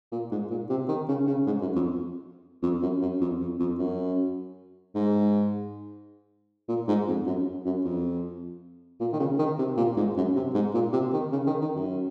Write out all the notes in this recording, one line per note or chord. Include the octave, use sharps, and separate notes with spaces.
A#2
G#2
A#2
C3
D#3
C#3
C#3
G#2
F#2
F2
F2
F#2
F#2
F2
F2
F2
F#2
G#2
A#2
G#2
F2
F#2
F#2
F2
A#2
D#3
C#3
D#3
C3
A#2
G#2
F#2
C3
G#2
A#2
C3
D#3
C#3
D#3
D#3
F#2